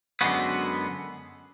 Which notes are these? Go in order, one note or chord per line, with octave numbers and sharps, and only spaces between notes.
F#2 D3 G#3 B3 F#4